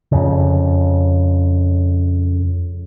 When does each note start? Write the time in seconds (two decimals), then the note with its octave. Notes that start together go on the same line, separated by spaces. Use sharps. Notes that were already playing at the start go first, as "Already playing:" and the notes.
0.12 F2 C#3